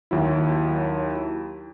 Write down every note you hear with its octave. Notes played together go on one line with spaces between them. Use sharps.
D#2 F#3 E4